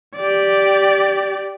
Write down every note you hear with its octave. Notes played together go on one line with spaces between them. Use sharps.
G4 D5